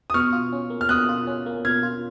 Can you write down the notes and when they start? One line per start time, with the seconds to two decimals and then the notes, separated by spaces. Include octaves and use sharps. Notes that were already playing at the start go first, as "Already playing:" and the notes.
0.10 D#6
0.14 B2 C#6 F6
0.33 F4
0.53 C#4
0.70 A#3
0.81 F6
0.89 B2 D#6 F#6
1.09 F4
1.27 C#4
1.46 A#3
1.65 B2 F6 G#6
1.83 F4